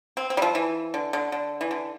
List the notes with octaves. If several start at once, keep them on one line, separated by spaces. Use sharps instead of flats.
C4
C4
G3
F3
E3
D3
D3
D3
E3
D3